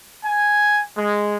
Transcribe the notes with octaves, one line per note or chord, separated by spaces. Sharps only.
G#5
G#3